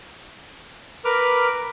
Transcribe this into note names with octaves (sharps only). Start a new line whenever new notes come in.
A#4 B4 D6 F6